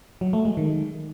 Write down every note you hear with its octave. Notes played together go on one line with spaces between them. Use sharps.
F#3
A3
G#3
D#3